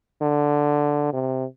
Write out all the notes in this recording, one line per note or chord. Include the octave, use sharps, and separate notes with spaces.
D3
C3